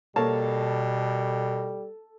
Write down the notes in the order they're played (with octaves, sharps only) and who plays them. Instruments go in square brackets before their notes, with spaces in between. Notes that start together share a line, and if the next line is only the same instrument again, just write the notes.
[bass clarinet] B2 [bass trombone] G3 [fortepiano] A#3 C#5 A5 [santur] A4